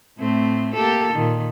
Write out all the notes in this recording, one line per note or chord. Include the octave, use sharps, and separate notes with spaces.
A2 A3 C4
A#3 G4 A4
A#2 D#3